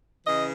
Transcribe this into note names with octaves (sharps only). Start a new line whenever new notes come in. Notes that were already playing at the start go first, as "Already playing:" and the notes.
C#3 E3 D#5